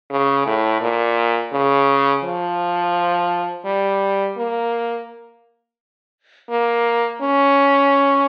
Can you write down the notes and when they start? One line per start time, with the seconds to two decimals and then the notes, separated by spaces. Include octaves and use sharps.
0.11 C#3
0.46 A2
0.81 A#2
1.53 C#3
2.24 F3
3.66 G3
4.37 A#3
6.50 A#3
7.22 C#4